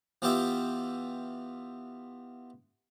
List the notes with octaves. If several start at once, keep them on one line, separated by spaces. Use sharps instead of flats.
E3 B3 F4 G4 E5 G5